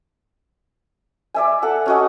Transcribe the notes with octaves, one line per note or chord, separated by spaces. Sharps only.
D5 E5 G#5
A4 F#5
C#4 F#4 D#5